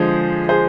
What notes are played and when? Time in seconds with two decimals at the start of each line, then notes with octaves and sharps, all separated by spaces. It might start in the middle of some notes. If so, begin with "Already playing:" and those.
Already playing: D3 F3 G#3 G#4 C5
0.49 G#4 C5